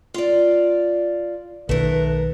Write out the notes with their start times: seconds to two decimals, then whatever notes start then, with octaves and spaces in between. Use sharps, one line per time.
0.14 F4 D5
1.69 B1 D#3 A3 A#4 B4